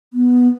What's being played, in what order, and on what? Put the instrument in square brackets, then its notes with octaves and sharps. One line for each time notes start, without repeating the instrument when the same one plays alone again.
[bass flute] B3